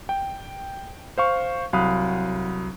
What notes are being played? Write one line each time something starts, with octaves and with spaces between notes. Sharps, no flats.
G5
C5 F5 C#6
C2 F#3 F5 B5 D#6 F#6